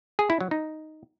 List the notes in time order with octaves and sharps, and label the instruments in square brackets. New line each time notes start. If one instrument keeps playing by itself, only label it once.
[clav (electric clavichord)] G#4
E4
F#3
D#4